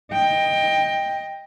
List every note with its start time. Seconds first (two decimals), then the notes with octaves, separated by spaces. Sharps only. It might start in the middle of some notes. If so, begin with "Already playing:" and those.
0.13 D#5 G5